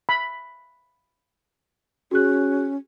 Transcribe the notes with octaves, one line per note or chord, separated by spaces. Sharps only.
B5
C#4 F#4 G#4 F#6